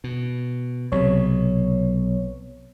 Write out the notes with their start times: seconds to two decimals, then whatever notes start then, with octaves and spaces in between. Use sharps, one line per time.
0.04 B2
0.92 B1 C3 C#5